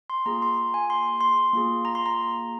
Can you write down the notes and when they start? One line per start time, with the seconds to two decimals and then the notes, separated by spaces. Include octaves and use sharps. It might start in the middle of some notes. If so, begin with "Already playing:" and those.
0.10 C6
0.26 A#3 F4 G#4 A#5
0.42 C6
0.74 G#5
0.90 C6
1.21 C6
1.53 A#3 F4 G#4
1.85 A#5
1.95 C6
2.06 A#5